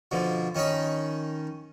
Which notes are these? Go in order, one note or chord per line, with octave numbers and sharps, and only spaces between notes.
B2 D3 F3
D#3 C#4 D#4 B5 C#6